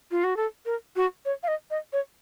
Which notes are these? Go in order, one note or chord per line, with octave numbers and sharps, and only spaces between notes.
F4
F#4
A4
A#4
F#4
C#5
F5
D#5
D#5
C#5